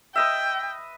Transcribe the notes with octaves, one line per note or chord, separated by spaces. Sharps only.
B4 D#5 E5 G5